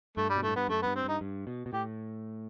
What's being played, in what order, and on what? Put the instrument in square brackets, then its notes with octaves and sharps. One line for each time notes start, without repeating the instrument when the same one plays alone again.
[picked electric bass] G2 [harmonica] A3
[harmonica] G3
[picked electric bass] B2
[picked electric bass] A2 [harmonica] A3
[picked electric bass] G2 [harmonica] B3
[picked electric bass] F#2 [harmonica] A3
[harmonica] B3
[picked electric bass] G2
[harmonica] C4
[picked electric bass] G2 [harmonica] D#4
[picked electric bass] G2
B2
B2
[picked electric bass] A2 [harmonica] G4